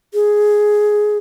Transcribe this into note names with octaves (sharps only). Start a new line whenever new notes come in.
G#4